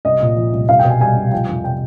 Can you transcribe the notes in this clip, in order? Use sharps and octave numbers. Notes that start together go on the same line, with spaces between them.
C2 D#5
A#2
F3
C2
C2 F5
G5
B2
G#5
G3 G#5
C2
F3 G5
F2
C3 G5